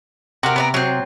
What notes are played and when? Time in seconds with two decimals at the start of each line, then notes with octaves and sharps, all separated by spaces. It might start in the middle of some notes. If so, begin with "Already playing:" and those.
0.43 C3 F#4 A#4
0.56 B3 D5 A#5
0.74 F#3 C4